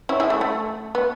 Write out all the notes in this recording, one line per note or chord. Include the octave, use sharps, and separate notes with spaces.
C#4 E4
E4 G#4
A3
A3
B3